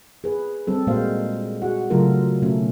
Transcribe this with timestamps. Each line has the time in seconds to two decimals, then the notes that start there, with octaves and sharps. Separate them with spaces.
0.24 G#4 B4
0.67 G3 C4 A4
0.87 A#2 G#3 A#3 F#4 C5 F5
1.62 F#4 G#4 F#5
1.90 C#3 F#3 A3 F4 A4 A#4
2.42 B2 A3 C#4